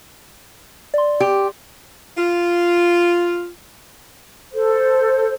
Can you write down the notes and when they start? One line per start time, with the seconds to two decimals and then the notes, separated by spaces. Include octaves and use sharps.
0.94 D5 C6
1.20 G4
2.16 F4
4.52 A4 C5